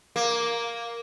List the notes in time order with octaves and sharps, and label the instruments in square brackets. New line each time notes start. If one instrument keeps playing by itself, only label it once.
[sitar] A#3